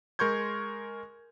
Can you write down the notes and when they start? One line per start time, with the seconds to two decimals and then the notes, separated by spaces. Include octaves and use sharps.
0.19 G#3 A#4 C6 C#6 G6 G#6